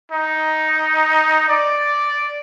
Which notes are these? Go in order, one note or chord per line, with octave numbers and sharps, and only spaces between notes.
D#4
D5